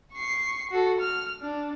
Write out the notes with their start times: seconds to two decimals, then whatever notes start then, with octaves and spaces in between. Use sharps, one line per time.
0.13 C#6 C7
0.71 F#4 A4
1.00 F6
1.41 D4